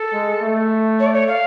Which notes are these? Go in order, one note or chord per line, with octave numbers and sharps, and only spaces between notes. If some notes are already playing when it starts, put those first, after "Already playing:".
Already playing: A4
G#3
A3
C#5
D5
C#5
F5